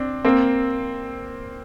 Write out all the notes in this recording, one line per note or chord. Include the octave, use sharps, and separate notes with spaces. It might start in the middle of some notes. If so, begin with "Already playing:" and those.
Already playing: C4 D4
A#3 C4